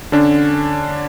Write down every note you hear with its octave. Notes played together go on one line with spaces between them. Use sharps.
D3 C#4 D4